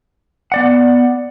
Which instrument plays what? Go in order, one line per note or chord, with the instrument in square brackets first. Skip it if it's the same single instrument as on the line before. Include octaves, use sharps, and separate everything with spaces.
[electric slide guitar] B3 D5 F#5